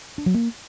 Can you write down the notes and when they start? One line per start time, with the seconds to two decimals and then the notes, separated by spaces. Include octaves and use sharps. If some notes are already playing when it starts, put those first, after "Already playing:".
0.18 D4
0.26 F#3
0.34 A#3